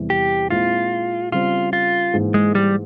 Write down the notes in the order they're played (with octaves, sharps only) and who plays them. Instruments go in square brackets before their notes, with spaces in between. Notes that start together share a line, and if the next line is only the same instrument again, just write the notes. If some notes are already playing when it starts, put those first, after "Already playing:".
Already playing: [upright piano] E2 C3 E3 G3
[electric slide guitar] G4
[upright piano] A#2 G#3 C4 E4 [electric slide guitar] F4
[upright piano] C#3 G3 C4 [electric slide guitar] F4
[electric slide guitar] F4
[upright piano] G#2 E3 A#3
[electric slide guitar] G#3
G3